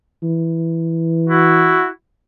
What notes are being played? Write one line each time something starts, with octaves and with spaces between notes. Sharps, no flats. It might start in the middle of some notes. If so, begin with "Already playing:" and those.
E3
E4 F#4